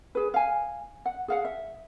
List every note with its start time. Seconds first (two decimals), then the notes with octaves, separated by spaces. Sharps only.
0.15 G#4 B4
0.34 F5 G#5
1.06 F#5
1.28 G#4 F5 F#5
1.45 E5